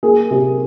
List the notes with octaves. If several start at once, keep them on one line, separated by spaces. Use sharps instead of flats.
A#3 G#4
C3